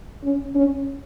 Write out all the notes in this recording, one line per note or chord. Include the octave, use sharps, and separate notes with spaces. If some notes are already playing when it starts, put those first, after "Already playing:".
C#4
C#4